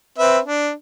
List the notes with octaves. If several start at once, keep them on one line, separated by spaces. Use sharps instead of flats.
C4 B4 E5
D4